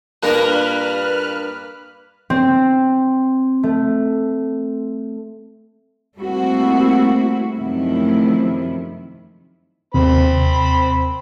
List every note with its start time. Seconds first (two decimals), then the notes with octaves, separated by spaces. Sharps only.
0.23 G2 A#2 A#3 D4 A#4 B4 F6 F#6
2.30 C4
3.63 A3
6.17 G3 A3 A#3 C4 E4 F#4
7.55 F#2 C3 D#3 F3 A3 E4
9.94 D#2 C3 C4 C5 B5